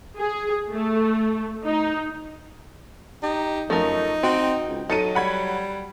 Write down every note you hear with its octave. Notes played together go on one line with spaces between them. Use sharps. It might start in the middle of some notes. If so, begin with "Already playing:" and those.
G#4
A3
D#4
D#4 G4
F#2 F3 A3 D#4 A#4 D#5
C4 F#4 G5
C#2
F#3 D#4 A4 C#7 D#7
G3 F#5 B5 G#6